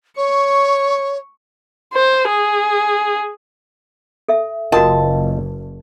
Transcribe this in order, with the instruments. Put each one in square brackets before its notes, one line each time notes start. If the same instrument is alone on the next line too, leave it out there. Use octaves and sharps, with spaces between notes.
[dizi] C#5 [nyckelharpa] C#6
[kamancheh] C5
G#4
[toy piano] A4 E5
[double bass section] F#1 F#2 [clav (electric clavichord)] F4 D#5 G5 [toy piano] F#4 A#4 [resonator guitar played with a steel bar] A5